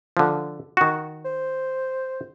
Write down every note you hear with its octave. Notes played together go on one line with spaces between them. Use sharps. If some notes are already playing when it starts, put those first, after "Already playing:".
D3 F3
D#3 F#4
C5